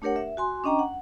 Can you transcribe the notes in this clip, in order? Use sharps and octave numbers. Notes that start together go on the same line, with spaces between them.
A3 D4 G4 A#4 C#5 F#5
E5
F#4 G#5 C6
C#4 D4 D#5 G5 A#5
F#5